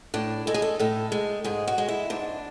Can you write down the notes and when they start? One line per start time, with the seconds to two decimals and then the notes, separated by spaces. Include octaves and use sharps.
0.14 A2 D4
0.47 G#3 A4
0.54 G#4
0.62 A4
0.79 A2 A4
1.12 G#3
1.44 G#2 G#4
1.67 F#4
1.78 G#3
1.88 E4
2.10 G#2 D4